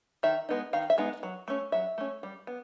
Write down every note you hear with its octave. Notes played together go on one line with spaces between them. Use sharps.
D#3 E5
G#3 B3 D#4
D#3 F5
E5
G#3 B3 D#4
F#3
A3 C#4
F#3 E5
A3 C#4
G3
B3